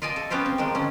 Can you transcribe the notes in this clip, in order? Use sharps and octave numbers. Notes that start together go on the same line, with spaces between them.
F4 D5 D#5 G#5 A5
A4
B3 C#4 F4 G4 C5
C4
D#3 F3 G#3 D4
D3 C#4